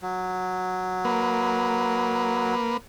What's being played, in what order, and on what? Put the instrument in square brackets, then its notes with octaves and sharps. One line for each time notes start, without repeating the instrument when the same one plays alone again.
[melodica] F#3
[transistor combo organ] A#3 B4